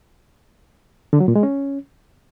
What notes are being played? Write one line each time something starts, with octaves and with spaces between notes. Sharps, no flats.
D3
F#3
A#2
G#3
C#4